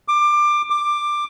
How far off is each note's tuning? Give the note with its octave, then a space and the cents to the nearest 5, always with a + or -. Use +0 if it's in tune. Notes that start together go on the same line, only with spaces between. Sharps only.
D6 +20
D6 +15